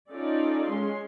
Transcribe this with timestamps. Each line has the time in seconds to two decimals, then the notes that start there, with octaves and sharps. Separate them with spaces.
0.12 C#4 D#4 F4 A4 D5
0.69 G#3 C#4 C6